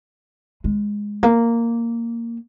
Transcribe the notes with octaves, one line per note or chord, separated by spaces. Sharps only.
G#3
A#3